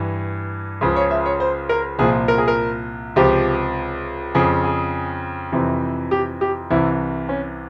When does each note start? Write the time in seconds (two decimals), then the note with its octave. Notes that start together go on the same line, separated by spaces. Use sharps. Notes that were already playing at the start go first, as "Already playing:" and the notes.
Already playing: G2 E3
0.81 C#2 C#3 F3
0.96 C#5
1.11 E5
1.26 C#5
1.40 C5
1.69 A#4
1.99 C2 A#2 F3 G#4
2.28 A#4
2.38 G#4
2.48 A#4
3.16 C#2 C3 F3 G4
4.35 F2 C#3 F3 G#4
4.64 G#4
5.52 F2 C3 E3
6.11 G4
6.41 G4
6.71 C2 C3 E3 E4
7.29 C#4